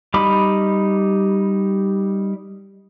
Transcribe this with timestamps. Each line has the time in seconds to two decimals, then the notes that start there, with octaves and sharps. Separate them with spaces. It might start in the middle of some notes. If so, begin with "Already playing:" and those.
0.14 G3 D#4 B5 D6